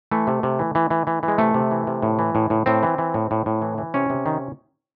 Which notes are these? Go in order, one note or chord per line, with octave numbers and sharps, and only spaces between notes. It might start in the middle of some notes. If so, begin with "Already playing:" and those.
E3 A3
C3
C3
E3
E3
E3
E3
E3
G#3
C3 A3
C3
E3
C3
A2
E3
A2
A2
A2 C4
E3
E3
A2
A2
A2
E3
E3
C3 C#4
C3
D#3